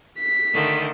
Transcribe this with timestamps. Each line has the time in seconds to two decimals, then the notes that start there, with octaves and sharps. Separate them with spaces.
0.19 B6
0.53 D3 D#3 A3